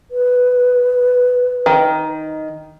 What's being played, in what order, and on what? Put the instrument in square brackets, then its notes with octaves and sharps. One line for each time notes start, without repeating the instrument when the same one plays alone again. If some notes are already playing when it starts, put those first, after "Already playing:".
[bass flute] B4
[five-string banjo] D#3